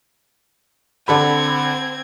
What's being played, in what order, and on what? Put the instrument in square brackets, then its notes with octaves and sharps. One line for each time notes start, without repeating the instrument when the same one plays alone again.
[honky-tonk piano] D3 A4 B5 [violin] C4 G#6